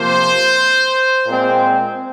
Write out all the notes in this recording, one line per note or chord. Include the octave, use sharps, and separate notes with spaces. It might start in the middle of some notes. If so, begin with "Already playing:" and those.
Already playing: C3 F3 A#3 C5
A#2 G#3 C4